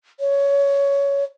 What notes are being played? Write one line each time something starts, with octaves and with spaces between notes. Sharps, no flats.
C#5